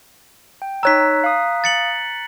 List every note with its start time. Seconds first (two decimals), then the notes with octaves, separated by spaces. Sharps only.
0.62 G5
0.83 D#4 C#5 A#5 E6 F#6 B6
1.24 F5 D#6
1.64 A6 C#7 F#7